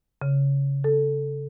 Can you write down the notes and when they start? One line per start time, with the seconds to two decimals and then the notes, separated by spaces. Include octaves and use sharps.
0.22 C#3
0.84 A4